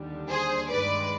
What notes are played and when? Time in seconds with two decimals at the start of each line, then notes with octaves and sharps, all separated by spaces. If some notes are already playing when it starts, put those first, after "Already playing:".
Already playing: D#2 D3 G3
0.29 G#4 C5
0.71 G2 D#3 G#3 B4 D5